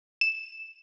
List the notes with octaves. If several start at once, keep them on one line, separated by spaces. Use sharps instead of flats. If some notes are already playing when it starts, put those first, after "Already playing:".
E7